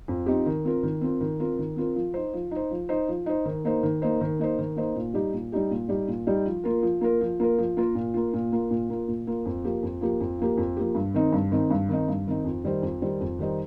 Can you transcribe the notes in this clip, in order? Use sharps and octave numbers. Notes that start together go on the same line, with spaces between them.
F2
F3 C4 D#4 G4
D#3
C4 F4 A#4
D#3
C4 F4 A#4
D#3
C4 F4 A#4
D#3
C4 F4 A#4
F3
D#4 C5
F3
D#4 C5
F3
D#4 C5
F3
D#4 C5
D#3
A#3 D#4 C5
D#3
A#3 D#4 C5
D#3
A#3 D#4 C5
D#3
A#3 D#4 C5
A#2
G3 D#4 G4
A#2
G3 D#4 G4
A#2
G3 D#4 G4
A#2
G3 D#4 G4
F3
A#3 F4 A#4
F3
A#3 F4 A#4
F3
A#3 F4 A#4
F3
A#3 F4 A#4
A#2
A#3 F4
A#2
A#3 F4
A#2
A#3 F4
A#2
A#3 F4
F2
F3 A#3 G4
F2
F3 A#3 G4
F2
F3 A#3 G4
F2
F3 A#3 G4
G2
D#3 C4 D#4
G2
D#3 C4 D#4
G2
D#3 C4 D#4
G2
D#3 C4 D#4
F2
D#3 G3 D#4 C5
F2
D#3 G3 D#4 C5
F2
D#3 G3 D#4 C5